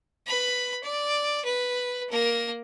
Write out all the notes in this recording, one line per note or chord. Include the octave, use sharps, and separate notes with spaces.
B4 B5
D5
B4
A#3 A#4